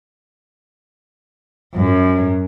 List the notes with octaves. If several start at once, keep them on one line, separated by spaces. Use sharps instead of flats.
F#2